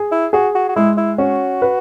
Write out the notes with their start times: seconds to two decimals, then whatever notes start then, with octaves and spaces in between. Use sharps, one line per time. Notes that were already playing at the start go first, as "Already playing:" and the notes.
Already playing: G#4
0.12 E4
0.33 F#4 G#4
0.55 F#4
0.69 F#4
0.76 G#3 E4
0.97 E4
1.18 C#4 F#4
1.62 B4